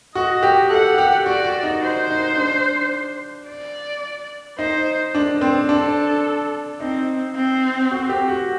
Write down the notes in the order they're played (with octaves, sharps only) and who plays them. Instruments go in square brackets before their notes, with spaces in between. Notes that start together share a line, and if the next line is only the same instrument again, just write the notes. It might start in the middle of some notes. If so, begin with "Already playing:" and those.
[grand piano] F#4 [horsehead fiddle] D#5
[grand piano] G4
[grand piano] A4 [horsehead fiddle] F#5
[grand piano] G4
[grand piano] F#4 [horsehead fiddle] D5
[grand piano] F#4
D#4
[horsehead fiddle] C5
[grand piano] D#4
D4
[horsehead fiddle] D5
[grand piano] D#4 [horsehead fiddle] C5
[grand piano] D4
C4
[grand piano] D4 [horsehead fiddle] A4
[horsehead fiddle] C4 [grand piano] D#4
[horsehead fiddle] C4
[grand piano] F#4
G4
F#4